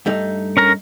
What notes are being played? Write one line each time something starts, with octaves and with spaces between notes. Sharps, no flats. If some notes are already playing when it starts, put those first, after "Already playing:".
G2 A3 D#4
C#4 A#4 A#5